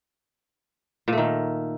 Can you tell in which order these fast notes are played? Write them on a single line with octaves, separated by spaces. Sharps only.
A#2 A3 D#3